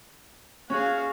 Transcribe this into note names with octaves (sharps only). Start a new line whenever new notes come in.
C#4 F#4 G#4 F5